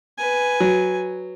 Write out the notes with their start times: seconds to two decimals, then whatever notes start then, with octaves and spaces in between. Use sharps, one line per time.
0.18 B4 G#5
0.60 F#3